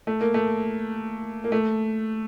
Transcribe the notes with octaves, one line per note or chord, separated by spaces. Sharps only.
A3
A#3
A3
A#3
A3